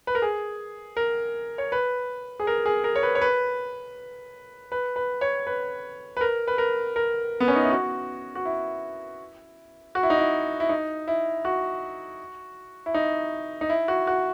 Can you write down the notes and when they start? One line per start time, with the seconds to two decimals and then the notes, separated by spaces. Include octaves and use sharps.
0.07 B4
0.15 A#4
0.22 G#4
0.97 A#4
1.58 C#5
1.72 B4
2.40 G#4
2.47 A#4
2.66 G#4
2.84 A#4
2.96 C#5
3.03 B4
3.15 C#5
3.21 B4
4.72 B4
4.96 B4
5.21 C#5
5.47 B4
6.17 B4
6.21 A#4
6.48 B4
6.58 A#4
6.96 A#4
7.40 B3
7.48 C#4
7.56 D#4
7.63 E4
7.70 F#4
8.35 F#4
8.45 E4
9.95 F#4
10.03 E4
10.10 D#4
10.18 E4
10.60 E4
10.69 D#4
11.08 E4
11.45 F#4
12.86 E4
12.94 D#4
13.61 D#4
13.70 E4
13.88 F#4
14.07 F#4